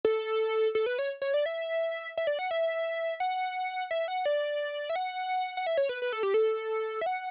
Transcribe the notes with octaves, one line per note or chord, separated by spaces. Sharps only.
A4
A4
B4
C#5
C#5
D5
E5
E5
D5
F#5
E5
F#5
E5
F#5
D5
E5
F#5
F#5
E5
C#5
B4
B4
A4
G4
A4
E5
F#5